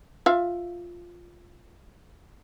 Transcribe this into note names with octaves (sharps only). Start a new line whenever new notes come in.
F4 E5 F5